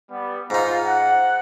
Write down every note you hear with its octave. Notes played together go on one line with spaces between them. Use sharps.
G3 B3
G#2 D#4 F4
F#5